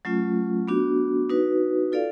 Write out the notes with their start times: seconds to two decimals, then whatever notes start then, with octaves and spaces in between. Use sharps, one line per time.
0.05 F#3 A3 C#4 F4
0.68 B3 D4 F#4
1.30 D#4 F#4 B4
1.92 F4 A4 D5 F5